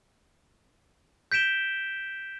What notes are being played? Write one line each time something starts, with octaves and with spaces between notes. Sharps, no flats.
G6 B6 D7 E7 G7